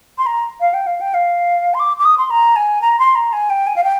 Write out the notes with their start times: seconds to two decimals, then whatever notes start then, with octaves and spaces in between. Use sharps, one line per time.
0.18 C6
0.26 A#5
0.60 F5
0.74 G5
0.87 F5
1.01 G5
1.14 F5
1.74 C6
1.79 D6
1.99 D6
2.05 D#6
2.18 C6
2.30 A#5
2.56 G#5
2.81 A#5
2.99 C6
3.15 A#5
3.33 G#5
3.50 G5
3.67 G#5
3.76 F5
3.84 G5